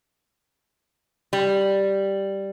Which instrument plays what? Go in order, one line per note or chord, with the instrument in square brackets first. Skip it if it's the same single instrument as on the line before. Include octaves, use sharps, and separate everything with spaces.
[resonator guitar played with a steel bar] G3